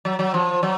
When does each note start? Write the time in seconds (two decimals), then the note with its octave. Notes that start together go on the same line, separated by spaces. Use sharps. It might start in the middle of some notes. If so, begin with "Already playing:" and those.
0.05 F#3
0.19 F#3
0.34 F3
0.63 F#3